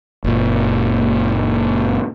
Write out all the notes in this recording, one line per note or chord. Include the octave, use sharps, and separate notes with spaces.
F#1 A#2